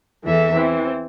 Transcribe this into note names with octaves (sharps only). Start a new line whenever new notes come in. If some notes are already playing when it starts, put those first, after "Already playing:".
E2 E3 A4 E5
E3 C4